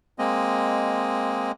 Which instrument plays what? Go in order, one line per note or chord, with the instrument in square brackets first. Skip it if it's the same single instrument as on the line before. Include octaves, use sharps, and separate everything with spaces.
[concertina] G#3 A#3 C4 D#5